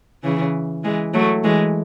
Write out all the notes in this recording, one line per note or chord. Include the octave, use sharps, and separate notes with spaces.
C#3 E3
E3 G#3
F#3 A3
E3 G#3